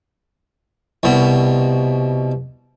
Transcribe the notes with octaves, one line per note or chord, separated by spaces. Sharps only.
C2 B2